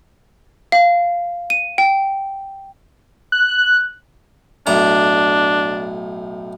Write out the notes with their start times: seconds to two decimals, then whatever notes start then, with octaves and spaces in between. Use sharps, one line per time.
0.72 F5
1.50 D#7
1.78 G5
3.32 F#6
4.67 B1 A2 D4 A#5